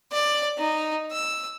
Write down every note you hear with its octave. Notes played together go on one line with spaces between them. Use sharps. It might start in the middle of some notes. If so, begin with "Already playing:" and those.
D5
D#4
E6